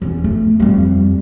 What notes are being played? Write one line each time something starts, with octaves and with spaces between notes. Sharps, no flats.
E2 C#4
A3
F2 G3